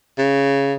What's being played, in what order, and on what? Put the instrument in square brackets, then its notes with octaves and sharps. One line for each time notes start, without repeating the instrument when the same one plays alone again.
[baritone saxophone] C#3